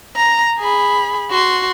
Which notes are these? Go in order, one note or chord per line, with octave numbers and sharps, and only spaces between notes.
A#5
G#4 B5
F#4 C6